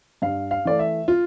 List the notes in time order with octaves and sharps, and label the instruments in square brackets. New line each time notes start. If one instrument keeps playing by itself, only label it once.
[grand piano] G2 F5
F5
E3 A3 D5
E5
F4